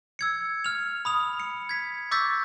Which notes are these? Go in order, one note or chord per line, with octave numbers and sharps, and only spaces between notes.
E6 G#6 C#7
F6 F7
B5 D#6 F7
C#7
G#6 B6
C#6 D6 E6 G6 A6 B6